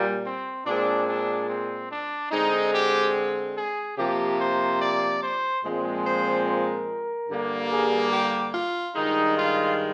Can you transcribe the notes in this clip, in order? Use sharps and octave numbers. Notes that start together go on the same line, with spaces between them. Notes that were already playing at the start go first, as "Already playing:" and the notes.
Already playing: A#2 G3 A#3
C4
A#2 G#3 C4 D4
D4
C4
D4
D3 G#3 C4 D#4
G4
G#4
C3 F3 A#3 G4
C5
D5
C5
A#2 F3 G#3 C4
C5
A#4
G2 D3 G3 A#3
G#4
G4
F4
G2 D#3 G#3 D#4
F4